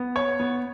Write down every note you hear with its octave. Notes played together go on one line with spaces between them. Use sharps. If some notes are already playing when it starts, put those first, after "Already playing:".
Already playing: B3
C#5
B3